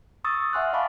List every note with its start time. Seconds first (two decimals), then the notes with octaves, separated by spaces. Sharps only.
0.24 C#6 D#6 E6 A6
0.53 E5 F#5 G#5 C6 F6 F#6
0.73 D#5 F5 A5 B5 C#6 D6